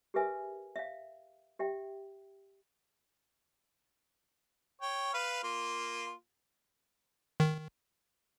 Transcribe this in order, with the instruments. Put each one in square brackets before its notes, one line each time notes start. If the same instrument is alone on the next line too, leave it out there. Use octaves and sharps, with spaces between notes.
[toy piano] G4 G#4 A#4 B4 E5 G#5
E5 F5
G4 E5 G5
[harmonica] C#5 G5
B4 F5 F6
A#3 F4
[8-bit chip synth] D#3